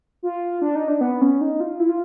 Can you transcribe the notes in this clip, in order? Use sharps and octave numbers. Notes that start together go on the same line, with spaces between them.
F4
D4
D#4
D4
B3
C#4
D#4
F4
E4
F4